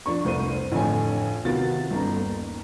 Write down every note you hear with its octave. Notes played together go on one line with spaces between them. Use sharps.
F3 D4 C#6
F1 C2 C5 D#7
A1 F2 D3 C#5 G#5
C3 D#3 B3 F4 F#4 A6
G1 C#4 D#4 A#5
D#2